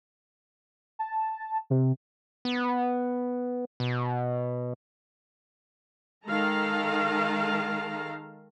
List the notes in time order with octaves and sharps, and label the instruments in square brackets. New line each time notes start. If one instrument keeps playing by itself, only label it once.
[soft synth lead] A5
C3
[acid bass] B3
B2
[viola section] D#3 G#3 A4 F5 A5 A#5